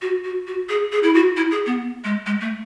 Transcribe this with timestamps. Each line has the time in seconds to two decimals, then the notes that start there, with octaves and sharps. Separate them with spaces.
0.02 F#4
0.24 F#4
0.47 F#4
0.69 G#4
0.92 G#4
1.03 E4
1.14 F#4
1.37 E4
1.51 G#4
1.66 B3
2.04 G#3
2.26 G#3
2.41 A3